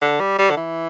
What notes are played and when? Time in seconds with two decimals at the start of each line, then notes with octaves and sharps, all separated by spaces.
0.02 D3
0.20 G3
0.39 G3
0.50 D3
0.57 E3